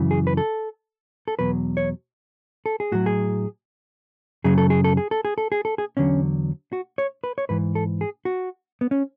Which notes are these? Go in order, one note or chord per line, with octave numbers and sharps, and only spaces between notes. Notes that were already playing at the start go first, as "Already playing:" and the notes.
Already playing: F#2 C#3 E3
G#4
B4
A4
A4
E2 B2 F#3 B4
C#5
A4
G#4
A2 F#3 F#4
G#4
F#2 C#3 F#3 G#4
A4
G#4
A4
G#4
A4
G#4
A4
G#4
A4
G#4
E2 D3 F#3 C#4
F#4
C#5
B4
C#5
G#2 E3 B4
A4
G#4
F#4
B3
C#4